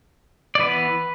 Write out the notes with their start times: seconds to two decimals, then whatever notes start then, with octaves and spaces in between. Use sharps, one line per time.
0.55 D5
0.59 E3 B3 B4